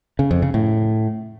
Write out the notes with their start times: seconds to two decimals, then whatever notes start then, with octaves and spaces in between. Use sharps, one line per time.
0.19 C#3
0.31 F2
0.42 C#3
0.54 A2